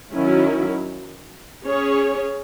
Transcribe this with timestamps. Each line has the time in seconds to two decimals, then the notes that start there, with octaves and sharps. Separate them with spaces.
0.13 D#3 F#3 C#4 E4
1.64 C#4 G#4 C#5